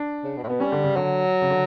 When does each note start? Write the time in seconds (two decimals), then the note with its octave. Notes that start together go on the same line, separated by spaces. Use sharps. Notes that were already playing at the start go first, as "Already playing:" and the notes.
Already playing: D4
0.24 C#3
0.37 B2
0.43 A2
0.48 B2 B3
0.60 G3 C#4
0.72 D3
0.84 C#3
0.96 D3 F#3
1.42 C#3
1.50 D3